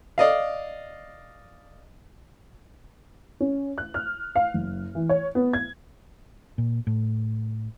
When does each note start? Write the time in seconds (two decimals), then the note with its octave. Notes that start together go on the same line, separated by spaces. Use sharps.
0.18 D5 D#5 F5
3.40 C#4
3.78 F#6
3.94 F6
4.36 F5
4.54 F#1
4.95 E3
5.09 C#5
5.35 B3
5.53 G#6
6.58 A#2
6.87 A2